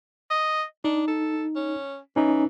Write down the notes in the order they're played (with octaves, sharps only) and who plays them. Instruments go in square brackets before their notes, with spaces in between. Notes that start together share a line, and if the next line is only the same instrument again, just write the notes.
[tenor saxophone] D#5
[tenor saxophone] D4 [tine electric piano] D#4
[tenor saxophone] A4
C#4
[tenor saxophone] E3 [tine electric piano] C#4 D#4